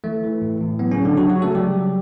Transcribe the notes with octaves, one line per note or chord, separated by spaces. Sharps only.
E3 A3
E3
A2
A2
F#3 B3
C#3 C#4
F#3
D3 D4
C#3 F#3 F#4
F#3 F#4
C#3
A3 A4
F#3 G3 G4
F#3